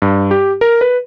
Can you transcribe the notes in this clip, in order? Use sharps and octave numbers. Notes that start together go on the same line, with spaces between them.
G2
G4
A#4
B4